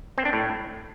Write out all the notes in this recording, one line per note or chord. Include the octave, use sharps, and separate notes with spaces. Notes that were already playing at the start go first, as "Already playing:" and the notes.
C4
D4
A2